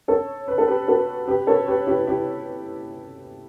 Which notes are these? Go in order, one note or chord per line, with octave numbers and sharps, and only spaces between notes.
A4 C#5
B4
A4
G4 B4
F#4 A4
G4 B4
A4 C#5
G4 B4
E4 G4
E4 G4